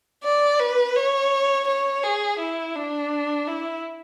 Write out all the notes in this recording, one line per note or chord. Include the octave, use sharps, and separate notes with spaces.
D5
B4
C#5
C#5
G#4
E4
D4
E4